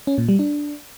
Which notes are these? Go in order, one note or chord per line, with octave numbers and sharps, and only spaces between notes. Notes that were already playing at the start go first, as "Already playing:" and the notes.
C#4
A#2
G3
D4